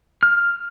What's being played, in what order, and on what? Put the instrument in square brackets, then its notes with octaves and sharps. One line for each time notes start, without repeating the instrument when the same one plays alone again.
[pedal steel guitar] F6